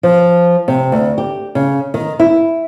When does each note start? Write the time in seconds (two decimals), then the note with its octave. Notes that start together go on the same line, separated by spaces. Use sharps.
0.03 F3
0.68 C3
0.92 D2
1.18 G4
1.55 C#3
1.94 D#3
2.19 E4